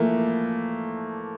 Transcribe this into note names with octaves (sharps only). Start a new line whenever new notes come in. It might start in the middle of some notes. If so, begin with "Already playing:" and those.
Already playing: E3 F3 A3 A#3